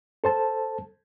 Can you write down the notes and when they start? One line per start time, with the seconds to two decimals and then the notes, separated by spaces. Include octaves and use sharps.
0.24 A4 C5 A5